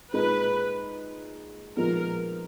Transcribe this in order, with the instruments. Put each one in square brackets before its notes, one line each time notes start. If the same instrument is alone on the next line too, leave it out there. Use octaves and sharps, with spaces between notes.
[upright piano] A#2 G#3 D#4 [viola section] B4
[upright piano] A#2 F3 G#3 B3 D#4 [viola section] A#4